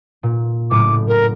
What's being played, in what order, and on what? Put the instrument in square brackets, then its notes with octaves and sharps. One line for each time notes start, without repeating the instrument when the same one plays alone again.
[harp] A#2
[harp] F#1 A2 [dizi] D6
[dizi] A#4